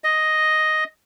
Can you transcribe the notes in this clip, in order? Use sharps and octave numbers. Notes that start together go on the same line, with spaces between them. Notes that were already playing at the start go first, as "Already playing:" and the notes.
D#5